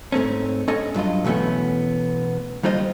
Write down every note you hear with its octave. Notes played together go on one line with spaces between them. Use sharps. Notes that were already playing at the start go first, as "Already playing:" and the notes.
G#2 A3 C4 C#4
C#4 A4 D5 D#5 G#5
G2 F#3 F4 D#5
B2 E3 A3 B3 C#4
D#2 G3 F4 C5 D#5